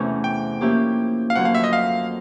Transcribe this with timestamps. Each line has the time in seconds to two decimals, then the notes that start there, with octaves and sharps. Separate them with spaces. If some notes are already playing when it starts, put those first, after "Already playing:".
Already playing: E2 C3 E3 A3 C#4
0.24 G5
0.61 F3 A#3 C#4 E4 G4
1.30 F5
1.36 F2 D3 F#3 A#3 F#5
1.45 F5
1.55 E5
1.64 D#5
1.73 F5